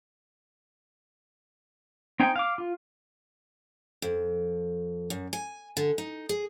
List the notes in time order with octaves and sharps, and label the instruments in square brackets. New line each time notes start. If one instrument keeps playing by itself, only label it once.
[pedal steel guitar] C4 D#4 G5 G#5
F5 D6
F4
[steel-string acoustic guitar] F2
F#2
G#5
D3
D#4
G#4